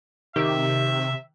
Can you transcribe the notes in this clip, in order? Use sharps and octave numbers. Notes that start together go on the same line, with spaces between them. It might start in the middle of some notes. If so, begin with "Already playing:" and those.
C3 D#3 G4 E5